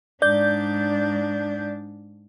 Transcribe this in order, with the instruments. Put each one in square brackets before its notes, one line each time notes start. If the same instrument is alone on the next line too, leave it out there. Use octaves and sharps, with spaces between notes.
[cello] G#2 D4 [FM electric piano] D5 G6